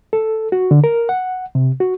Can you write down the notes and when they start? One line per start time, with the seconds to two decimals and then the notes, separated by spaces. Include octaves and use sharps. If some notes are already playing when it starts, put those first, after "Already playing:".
0.13 A4
0.52 F#4
0.71 D3
0.84 A#4
1.09 F#5
1.55 C3
1.80 F#4